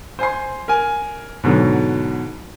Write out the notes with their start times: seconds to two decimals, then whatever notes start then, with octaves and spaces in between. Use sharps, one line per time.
0.19 C5 G#5 C6
0.68 A#4 G#5
1.43 G#2 B2 D3 F#3